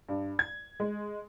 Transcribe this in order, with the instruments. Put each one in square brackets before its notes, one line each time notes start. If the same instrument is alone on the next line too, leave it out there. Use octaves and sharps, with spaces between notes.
[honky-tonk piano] G2
G#6
G#3